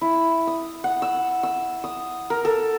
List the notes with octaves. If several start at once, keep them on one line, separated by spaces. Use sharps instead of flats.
E4
D#6
F#5
E6
E6
D#6
A#4
A4